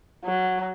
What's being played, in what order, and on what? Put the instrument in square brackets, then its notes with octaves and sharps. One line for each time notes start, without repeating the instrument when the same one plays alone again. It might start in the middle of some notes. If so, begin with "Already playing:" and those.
[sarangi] F#3